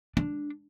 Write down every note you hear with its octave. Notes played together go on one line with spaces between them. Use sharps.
D4